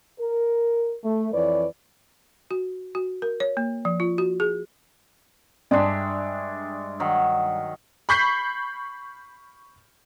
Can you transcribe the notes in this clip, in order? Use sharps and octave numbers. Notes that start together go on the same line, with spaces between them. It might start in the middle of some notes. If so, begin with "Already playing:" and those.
A#4
A3
F2 E3 B4 C#5 D5
F#4
F#4
A#4
C#5
A#3
F3
F4
F#4
G#4
G2 G#3 D4 D5 E5 G5
D#3 F#3
B5 C#6 G6 B6 C7